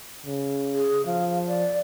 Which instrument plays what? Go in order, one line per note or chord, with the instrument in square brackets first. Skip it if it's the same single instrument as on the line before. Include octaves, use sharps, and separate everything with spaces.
[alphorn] C#3
[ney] G#4
[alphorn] F3 [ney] F5
[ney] D5